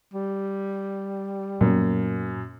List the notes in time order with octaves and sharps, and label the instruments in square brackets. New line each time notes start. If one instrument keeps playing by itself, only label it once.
[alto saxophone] G3
[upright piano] F#2 [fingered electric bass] A#2 A#3 B3